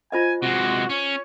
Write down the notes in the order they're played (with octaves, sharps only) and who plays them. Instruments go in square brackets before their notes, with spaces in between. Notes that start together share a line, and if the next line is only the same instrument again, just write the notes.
[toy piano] F4 C5 D#5 [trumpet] G#5
[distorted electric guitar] C3 G#3 [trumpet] F#4
[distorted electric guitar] C#4 [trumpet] C#5